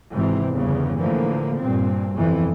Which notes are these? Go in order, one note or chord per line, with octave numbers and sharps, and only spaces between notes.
G#1 G#2 C3 E3 C4
G1 E2 G2 C#3
A2 D3 E3 F3 A#3
G2 A#2 C4
G1 F2 C3 E3